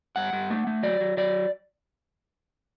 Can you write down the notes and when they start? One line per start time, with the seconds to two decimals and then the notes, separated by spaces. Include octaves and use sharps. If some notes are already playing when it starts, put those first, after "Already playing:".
0.16 G2 F#5
0.33 G2
0.50 A3
0.67 A3
0.83 F#3 D5
1.00 F#3
1.17 F#3 D5